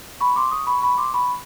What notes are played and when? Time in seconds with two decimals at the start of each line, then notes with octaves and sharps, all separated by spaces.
0.21 B5 C#6
0.36 C6 D6
0.51 C#6 D#6
0.67 B5 C#6
0.82 B5 C#6
0.98 C6 D6
1.13 B5 C#6